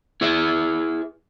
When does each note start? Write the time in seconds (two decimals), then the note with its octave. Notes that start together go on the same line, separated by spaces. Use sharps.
0.21 E4 G#4 B4 E5